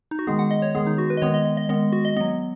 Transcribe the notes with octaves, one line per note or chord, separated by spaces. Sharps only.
D#4
F#4
D#3 G#3 B3 G#4
F#5
D#5
C#5
D#3 G#3 B3 G#4
D#4
F#4
B4
D#5
D#3 G#3 B3 C#5
D#5
D#5
D#5
D#3 G#3 B3 D#5
F#4
D#5
F#3 B3 D#5